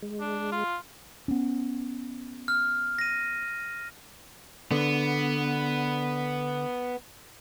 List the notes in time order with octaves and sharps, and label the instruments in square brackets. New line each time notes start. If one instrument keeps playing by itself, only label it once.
[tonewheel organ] G#3
[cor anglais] D4
F4
[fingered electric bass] B3 C#4
[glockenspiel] F6
A#6 D#7
[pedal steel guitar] D3 [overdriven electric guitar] B3